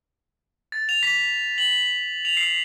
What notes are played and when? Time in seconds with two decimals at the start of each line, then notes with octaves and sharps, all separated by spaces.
0.72 A6
0.89 F7
1.03 B6
1.58 F#7
2.25 F7
2.37 C7